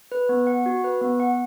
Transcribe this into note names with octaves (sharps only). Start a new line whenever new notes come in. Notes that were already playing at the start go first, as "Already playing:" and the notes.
B4
B3
F#5
F#4
B4
B3
F#5